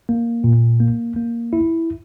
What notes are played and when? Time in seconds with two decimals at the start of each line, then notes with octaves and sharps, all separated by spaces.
0.09 A#3
0.44 A#2
0.80 A#3
1.16 A#3
1.53 E4